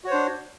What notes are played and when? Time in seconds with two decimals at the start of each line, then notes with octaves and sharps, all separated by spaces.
0.04 F#4
0.07 C#5
0.10 C5
0.13 D4